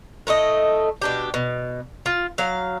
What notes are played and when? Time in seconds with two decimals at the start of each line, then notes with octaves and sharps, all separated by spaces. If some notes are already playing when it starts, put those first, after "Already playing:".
0.27 A2 A3 F#4 D#5
1.02 B2 D4 G4
1.34 B2
2.06 F4
2.38 F#3 F5